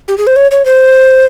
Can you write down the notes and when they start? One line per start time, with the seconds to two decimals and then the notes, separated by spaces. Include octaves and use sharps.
0.08 G4
0.18 G#4
0.27 C5
0.36 C#5
0.51 C#5
0.65 C5